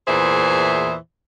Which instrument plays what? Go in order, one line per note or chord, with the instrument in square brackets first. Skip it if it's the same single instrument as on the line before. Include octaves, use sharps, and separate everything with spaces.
[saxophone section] E2 A#2 E3 G#4 C5 E5